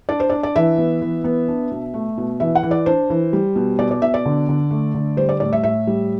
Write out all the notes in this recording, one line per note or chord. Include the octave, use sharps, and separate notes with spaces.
D4 D5
C5
D4 D5
D5
E3 E5
B3
E3
B3
D4
B2
A3
B2
E3 E5
F#5
E3
D5
D4 C5
E3
G3
B2
B2 D5
D5
B2 E5
D5
D3
D3
A3
D3
G3 C5
D5
A2 D5
E5
A2 E5
G3